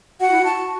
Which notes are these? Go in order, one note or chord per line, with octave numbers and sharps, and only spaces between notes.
F#4 F#5
E4
F#4 A5